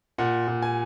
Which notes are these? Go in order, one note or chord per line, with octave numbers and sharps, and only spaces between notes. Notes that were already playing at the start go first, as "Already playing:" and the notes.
A#2 F#5
A#2
G#5